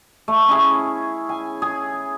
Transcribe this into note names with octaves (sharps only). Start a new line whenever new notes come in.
A3
C#4 E4 G#4
G#5
G#4